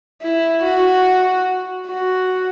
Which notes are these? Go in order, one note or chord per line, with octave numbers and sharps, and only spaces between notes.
E4
F#4
F#4